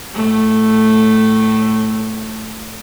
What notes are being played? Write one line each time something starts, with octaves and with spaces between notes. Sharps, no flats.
A2 A3